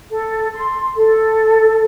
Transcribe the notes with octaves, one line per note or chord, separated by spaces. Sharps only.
A4
C6
A4